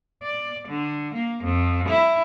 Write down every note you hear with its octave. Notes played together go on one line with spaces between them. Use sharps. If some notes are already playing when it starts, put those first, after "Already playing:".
D5
D3
A#3
F2
E4